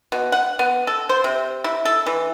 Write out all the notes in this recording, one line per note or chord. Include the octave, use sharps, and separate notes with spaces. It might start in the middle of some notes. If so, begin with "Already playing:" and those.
B2
F#5
B3
A4
C5
C3
E4
A4
E3